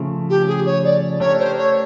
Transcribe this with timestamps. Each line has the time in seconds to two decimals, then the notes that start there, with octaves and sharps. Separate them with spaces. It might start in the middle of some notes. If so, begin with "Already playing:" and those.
Already playing: C#3 F3 A3
0.29 G4
0.47 G#4
0.66 C#5
0.84 D5
1.20 A3 D4 G4 A#4 C#5
1.39 C5
1.58 C#5